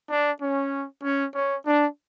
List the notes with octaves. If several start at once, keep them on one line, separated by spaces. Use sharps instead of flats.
D4
C#4
C#4
C#4
D4